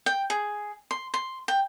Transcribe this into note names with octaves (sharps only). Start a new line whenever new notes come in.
G5
G#4
C6
C6
G5